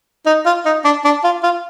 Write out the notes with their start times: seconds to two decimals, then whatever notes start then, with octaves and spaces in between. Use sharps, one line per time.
0.26 D#4
0.46 F4
0.65 D#4
0.85 D4
1.04 D4
1.24 F4
1.43 F4